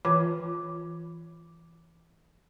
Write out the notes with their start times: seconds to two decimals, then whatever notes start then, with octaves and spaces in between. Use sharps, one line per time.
0.05 E3 F4 C#5 D6